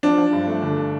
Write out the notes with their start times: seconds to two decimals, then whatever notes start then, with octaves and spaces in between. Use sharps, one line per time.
0.03 F3 D4
0.18 F3
0.33 G2
0.47 A3
0.62 G1